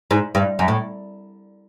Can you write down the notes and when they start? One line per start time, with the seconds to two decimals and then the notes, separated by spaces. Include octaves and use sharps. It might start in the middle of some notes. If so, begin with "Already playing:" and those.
0.11 G#2
0.35 G2
0.59 F#2
0.68 A2